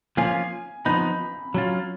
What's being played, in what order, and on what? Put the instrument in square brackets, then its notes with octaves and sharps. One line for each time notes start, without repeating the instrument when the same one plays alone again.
[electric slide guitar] F3 A#3 C#4 F4 [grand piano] G#5
[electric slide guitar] F3 B3 D#4 [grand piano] B5
[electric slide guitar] F#3 C#4 F4